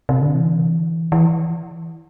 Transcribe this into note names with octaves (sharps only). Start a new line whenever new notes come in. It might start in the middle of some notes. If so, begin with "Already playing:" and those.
C3
D3
E3
E3